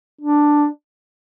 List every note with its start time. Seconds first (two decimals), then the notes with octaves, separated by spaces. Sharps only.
0.21 D4